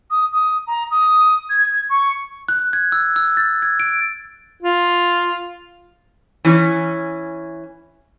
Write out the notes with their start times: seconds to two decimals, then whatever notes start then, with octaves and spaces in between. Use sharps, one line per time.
0.10 D#6
0.32 D#6
0.67 A#5
0.91 D#6
1.49 G#6
1.90 C#6
2.49 F#6
2.73 G#6
2.92 E6
3.16 E6
3.37 A6
3.62 G#6
3.80 D7
4.62 F4
6.45 E3 C#4